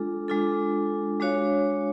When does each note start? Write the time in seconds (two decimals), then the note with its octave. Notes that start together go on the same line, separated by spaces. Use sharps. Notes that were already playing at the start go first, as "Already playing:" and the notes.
Already playing: G#3 D4 F4 A4
0.28 G#3 D4 F4 A4
1.20 G#3 D4 F#4 C#5 F5